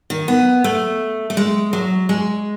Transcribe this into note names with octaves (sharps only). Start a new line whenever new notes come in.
D#3
B3
A3
A3
G#3
F#3
G#3